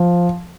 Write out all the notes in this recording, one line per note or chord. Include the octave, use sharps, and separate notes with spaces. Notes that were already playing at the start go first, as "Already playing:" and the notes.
Already playing: F3